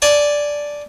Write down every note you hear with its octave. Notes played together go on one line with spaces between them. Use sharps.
D5 G#5 A5